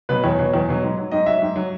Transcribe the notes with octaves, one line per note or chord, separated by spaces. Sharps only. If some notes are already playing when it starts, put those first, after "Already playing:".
B2 F#3 B4
E2 C#5
B2 F#3
E2
B2 F#3
G#2
F#3
G#2 D#5
F#3 E5
G#2
F#3